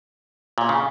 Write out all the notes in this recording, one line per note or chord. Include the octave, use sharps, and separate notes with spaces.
A#2
C#3